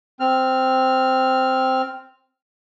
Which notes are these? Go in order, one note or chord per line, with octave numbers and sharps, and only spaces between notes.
C4 F6